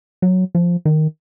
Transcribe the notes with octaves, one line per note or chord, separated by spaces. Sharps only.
F#3
F3
D#3